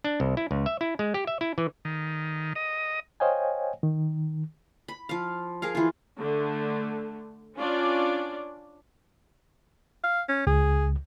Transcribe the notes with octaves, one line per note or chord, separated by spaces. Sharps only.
D4
C2
E4
C#2
E5
E4
G#3
G4
E5
E4
E3
D#3
D#5
C5 C#5 D#5 F5 G5 G#5
D#3
B5
F3 F5
G#4 A#4 F5
E3 F4
D3 A3
C#4 D4 F4 D5
F5
C#4
C#2 G#4